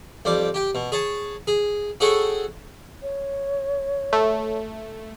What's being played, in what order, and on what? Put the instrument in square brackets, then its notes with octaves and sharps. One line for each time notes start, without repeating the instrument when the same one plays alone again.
[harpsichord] F2 G3 D6
G4 G5
B2
G#4 C#5 A5
G#4
F#4 G#4 A4 C#5 F#5 G5
[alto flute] C#5
[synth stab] A3